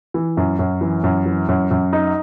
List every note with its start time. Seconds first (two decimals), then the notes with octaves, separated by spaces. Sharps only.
0.14 E3
0.37 F#2
0.59 F#2
0.81 E3
1.04 F#2
1.26 E3
1.49 F#2
1.71 F#2
1.93 D#4